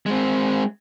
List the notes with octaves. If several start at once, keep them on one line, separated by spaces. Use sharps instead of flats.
G#3 C4